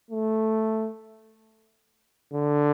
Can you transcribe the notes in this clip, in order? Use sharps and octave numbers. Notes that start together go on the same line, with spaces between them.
A3
D3